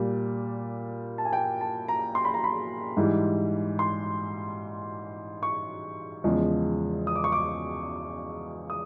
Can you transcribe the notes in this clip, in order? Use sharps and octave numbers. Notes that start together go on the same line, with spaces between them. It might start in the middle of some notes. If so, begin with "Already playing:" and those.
Already playing: A#2 G3
A5
G#5
G5
A5
A#5
C6
B5
A#5
B5
G#2 E3 G3
C6
C#6
E2 C#3 F3 G#3
D#6
D6
C#6
D6
D#6